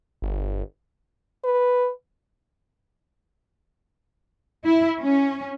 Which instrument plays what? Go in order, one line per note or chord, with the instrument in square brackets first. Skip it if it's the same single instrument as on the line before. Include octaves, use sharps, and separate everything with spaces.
[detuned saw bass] G1
[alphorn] B4
[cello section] E4
C#4